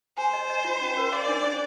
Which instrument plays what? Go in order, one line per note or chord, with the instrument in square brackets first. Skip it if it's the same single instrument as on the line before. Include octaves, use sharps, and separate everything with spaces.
[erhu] C5 [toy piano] G#5
[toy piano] D#5
D#5
F4
C#4
A#4
[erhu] D5 [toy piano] F5
[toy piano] D4
C5